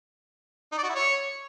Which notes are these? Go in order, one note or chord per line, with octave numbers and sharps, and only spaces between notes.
D#4
D5
F#4
E4
C#5